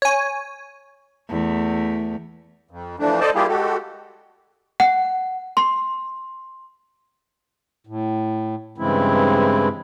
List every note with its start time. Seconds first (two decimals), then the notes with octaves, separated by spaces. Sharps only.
0.02 C#5 G#5
1.29 E2 A3
2.71 F2
2.99 E3 F3 A3 D4
3.20 A4 C5 D5 D#5 A5
3.35 G3 A#3 E4 F4 G4 G#4
3.49 G#3 F#4 G4 A4
4.80 F#5
5.57 C6
7.87 A2
8.78 G2 C#3 E3 G#3 C4 E4